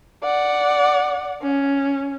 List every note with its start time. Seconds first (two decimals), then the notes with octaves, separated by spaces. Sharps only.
0.23 D5 F#5
1.42 C#4